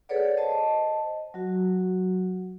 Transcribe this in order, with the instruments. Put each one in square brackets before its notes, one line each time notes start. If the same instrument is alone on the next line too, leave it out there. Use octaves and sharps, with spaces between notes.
[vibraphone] G#4 A4 B4 C#5 D5 F#5
C5 D#5 A5
F#3 F#4